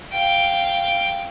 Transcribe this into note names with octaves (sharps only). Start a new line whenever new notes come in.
F5 G5